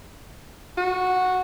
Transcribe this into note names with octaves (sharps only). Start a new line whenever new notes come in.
F#4